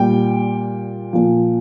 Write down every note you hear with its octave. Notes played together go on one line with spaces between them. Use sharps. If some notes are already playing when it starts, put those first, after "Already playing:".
Already playing: A#2 G3 G5
A#2 F3